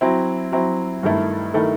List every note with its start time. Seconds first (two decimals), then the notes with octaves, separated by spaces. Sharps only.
0.01 F#3 C4 E4
0.52 F#3 C4 E4
1.03 G2 D#3 A3 E4 A4
1.54 D#3 A3 E4 A4